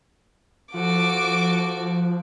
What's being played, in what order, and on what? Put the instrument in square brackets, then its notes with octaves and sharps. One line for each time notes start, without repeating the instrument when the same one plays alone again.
[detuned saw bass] F3 [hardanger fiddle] F#4 A4 [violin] D6